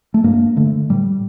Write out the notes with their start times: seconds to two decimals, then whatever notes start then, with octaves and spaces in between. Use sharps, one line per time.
0.14 A3
0.24 G2 A#3
0.57 D3 A3
0.90 A2 G3